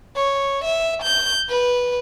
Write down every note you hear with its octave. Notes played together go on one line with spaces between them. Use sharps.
C#5
E5
G6
B4